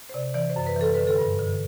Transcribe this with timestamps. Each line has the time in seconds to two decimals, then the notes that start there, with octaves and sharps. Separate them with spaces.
0.09 C5
0.14 C3 D5
0.34 E3 D5
0.50 C5
0.56 F#2
0.66 B4
0.76 E3 A4
0.94 D3 B4
1.07 A4
1.18 G2
1.39 D3